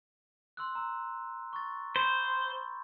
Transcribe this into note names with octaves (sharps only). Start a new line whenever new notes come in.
C6 E6 F#6
A#5 E6
C#6 A6
C5 B5 C6 G6